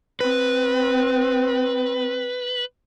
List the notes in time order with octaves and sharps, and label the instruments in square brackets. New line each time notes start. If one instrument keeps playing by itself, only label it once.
[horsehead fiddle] C4 [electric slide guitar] B4